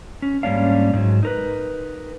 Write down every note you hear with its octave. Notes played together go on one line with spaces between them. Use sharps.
C#4
G#2 G3 A#3 C#4 D4 F5
G#2 F#3
D#4 A#4 B4